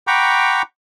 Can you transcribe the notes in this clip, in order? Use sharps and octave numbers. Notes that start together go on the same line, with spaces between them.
F#5 G5 A#5 B5 C#6 D6